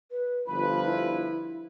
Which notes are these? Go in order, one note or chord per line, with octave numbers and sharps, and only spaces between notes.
B4
G1 F3 B4 B5
E4